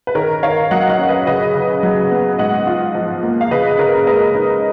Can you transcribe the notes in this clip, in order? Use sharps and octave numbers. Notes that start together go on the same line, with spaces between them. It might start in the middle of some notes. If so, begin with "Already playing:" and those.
B4
D#3 A#4 C#5
D#3 C#5 F5
F#3 D#5 F#5
D#5 F#5
C#4
B4 D#5
C#3 B4 D#5
C#3
F#3
B3
G#2 D#5 F#5
F4
F3
A#3
F5
C#3 B4 D#5
D#5
C#3 A#4 C#5
G#3 B4 D#5
D#4